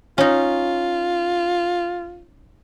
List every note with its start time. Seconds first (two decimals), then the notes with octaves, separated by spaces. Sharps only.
0.18 C#4 D#4 F4